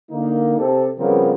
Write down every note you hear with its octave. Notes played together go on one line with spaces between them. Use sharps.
D3 A#3 D#4
C3 C4 G4 A4
C#3 F3 G3 B3 C4 A#4